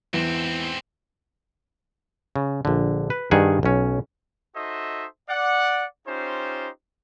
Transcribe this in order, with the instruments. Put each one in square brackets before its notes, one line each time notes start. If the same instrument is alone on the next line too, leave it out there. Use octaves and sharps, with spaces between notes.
[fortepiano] E2 [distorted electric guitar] G#2 C4
[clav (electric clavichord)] C#3
A#1 D3
B4
G2 D#3 G#4 F#5
B1 C#4
[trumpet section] D#4 F#4 A4 C5 D#5 E5
D5 F#5
C#4 D#4 F4 G4 C5